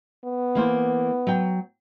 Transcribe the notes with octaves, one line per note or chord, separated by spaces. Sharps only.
B3
E3 A#3 C5
F#3 G5